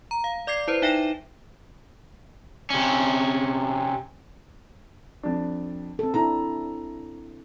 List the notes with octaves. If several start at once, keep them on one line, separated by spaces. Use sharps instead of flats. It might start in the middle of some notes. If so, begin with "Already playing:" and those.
A#5
F5
D5 D6 G#6 C7
E4 B4 C5
D#4 E5 G5 A#6 E7
C3 C#4
F2 D4
C4 A4
D4 E4 A4 A#5